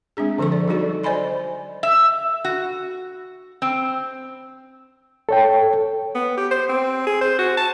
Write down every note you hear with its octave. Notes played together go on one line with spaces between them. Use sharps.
G#3 C4 D4 G#4
D3 F3 G#4 A4 C#6
D5
F#3 G3 D#4 F#4 A4 D5
C5 D5 D#5 G#5 B5 C6
E5
F#4
C4
A4 C#5 G5
B3
G4
C5
C4
G#4
C5
F#4
A5